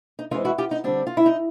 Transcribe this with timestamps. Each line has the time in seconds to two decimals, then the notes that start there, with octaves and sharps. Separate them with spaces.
0.19 D#4
0.31 E3 D#4 F4
0.34 G#3 C4
0.45 E4 F#4
0.58 F4 G4
0.71 D#4
0.84 D3 G3 C4 D4
1.07 F4
1.17 E4
1.26 D#4